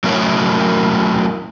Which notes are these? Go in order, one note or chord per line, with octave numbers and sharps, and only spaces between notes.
F#3 A3 C#4 E4 A#4 C#5